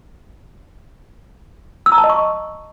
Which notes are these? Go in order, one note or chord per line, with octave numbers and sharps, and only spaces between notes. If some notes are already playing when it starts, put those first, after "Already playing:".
E6
A#5
A5
D#5
C#6